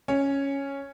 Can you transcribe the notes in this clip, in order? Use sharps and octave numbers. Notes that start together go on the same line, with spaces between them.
C#4